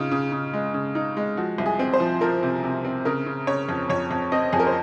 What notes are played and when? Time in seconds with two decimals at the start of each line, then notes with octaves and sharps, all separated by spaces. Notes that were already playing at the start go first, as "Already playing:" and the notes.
Already playing: C#3 D#4 F4
0.11 C#3
0.32 C#3
0.53 G#3
0.74 C#3
0.95 D#4
1.17 G#3
1.37 F3 F#4
1.58 C2
1.66 G#4
1.79 C4
1.93 C5
2.00 F3
2.21 F3 A#4
2.43 C3
2.64 C3
2.85 C4
3.05 C#3 A#4
3.26 C#3
3.47 C#3 C#5
3.69 F2
3.89 F2 C#5
4.11 F2
4.32 C4 D#5
4.52 F2 G#4
4.60 A#4
4.67 C5